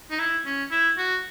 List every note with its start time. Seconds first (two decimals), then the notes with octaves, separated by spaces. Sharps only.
0.11 D#4
0.19 E4
0.46 C#4
0.71 E4
0.98 F#4